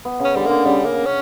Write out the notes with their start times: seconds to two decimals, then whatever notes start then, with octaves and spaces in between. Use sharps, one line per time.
0.05 B3
0.20 C#3 C#4
0.35 D3 G3
0.46 D3 A#3
0.65 C#3 G3
0.85 A#3
1.05 C#4